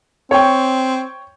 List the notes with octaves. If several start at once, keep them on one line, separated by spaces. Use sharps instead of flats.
C4 C#5 G5